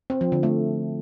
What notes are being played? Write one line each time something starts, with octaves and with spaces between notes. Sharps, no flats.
C4
F3
D3
A3